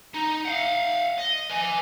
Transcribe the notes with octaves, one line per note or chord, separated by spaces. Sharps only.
D#4
F5 F#5
D#5
B4 G#5